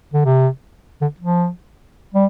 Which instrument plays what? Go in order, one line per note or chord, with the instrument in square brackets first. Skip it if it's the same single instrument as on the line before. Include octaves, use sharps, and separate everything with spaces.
[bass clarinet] D3
C3
D3
F3
G3